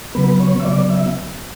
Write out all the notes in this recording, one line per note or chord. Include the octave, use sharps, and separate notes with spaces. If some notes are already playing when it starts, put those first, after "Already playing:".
C#3 F#3 B3 B4
C#5
E5
C#3 F#3 B3 D5
E5